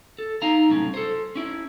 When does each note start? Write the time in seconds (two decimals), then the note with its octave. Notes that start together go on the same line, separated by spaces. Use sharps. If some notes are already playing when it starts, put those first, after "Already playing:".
0.19 A4
0.42 D#4 F5 A#5
0.70 C2 F#2 A2 C#4
0.94 A4 C5
1.35 C#4 E4